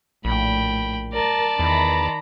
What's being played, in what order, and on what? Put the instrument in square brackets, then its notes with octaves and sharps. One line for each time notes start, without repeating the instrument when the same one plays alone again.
[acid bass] A#1 [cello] A2 [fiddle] G5 B5
[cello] A#4 [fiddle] D5 A5
[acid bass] E2 [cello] D#3 [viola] A#5 B5